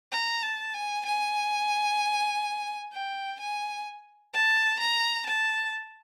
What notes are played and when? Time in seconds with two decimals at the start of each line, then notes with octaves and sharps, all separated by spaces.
0.12 A#5
0.43 A5
0.74 G#5
1.05 G#5
2.93 G5
3.40 G#5
4.33 A5
4.80 A#5
5.26 A5